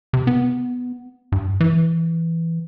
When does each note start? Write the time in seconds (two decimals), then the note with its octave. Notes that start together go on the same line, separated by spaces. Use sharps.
0.13 C3
0.27 B3
1.32 G2
1.60 E3